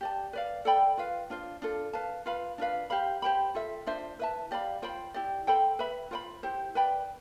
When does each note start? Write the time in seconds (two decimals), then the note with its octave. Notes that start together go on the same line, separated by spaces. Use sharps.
0.01 G4 D5 A5
0.33 B4 D5 F5
0.65 A4 D5 G5 B5
0.97 F4 B4 F5
1.30 D4 F4 C5
1.62 D4 F4 A4
1.93 B4 F5 A5
2.26 F4 B4 F5 B5
2.58 D4 F4 B4 F5
2.90 G4 C5 F5 B5
3.22 G4 C5 G5 B5
3.55 F4 A4 E5
3.86 D4 F4 C5 E5
4.19 E4 B4 E5 A5
4.51 G4 D5 F5 B5
4.82 F4 C5 G5 B5
5.14 E4 G4 D5
5.47 A4 C5 G5 B5
5.79 B4 E5 B5
6.11 F4 C5 G5 B5
6.43 E4 G4 C5
6.75 B4 D5 G5 B5